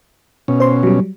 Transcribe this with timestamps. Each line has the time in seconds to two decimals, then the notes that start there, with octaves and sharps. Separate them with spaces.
0.48 B2 C#4
0.60 C5 C6
0.83 F#3 G3